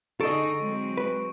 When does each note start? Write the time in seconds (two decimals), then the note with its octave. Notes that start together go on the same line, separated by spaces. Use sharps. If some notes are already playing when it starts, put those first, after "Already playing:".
0.21 D3 D#4 G#4 A4 D#5 C#6 D7
0.58 F#3 G#3 C4
0.97 B4